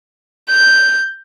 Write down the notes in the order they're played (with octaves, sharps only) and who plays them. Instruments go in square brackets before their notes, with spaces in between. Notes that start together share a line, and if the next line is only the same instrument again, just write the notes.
[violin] G6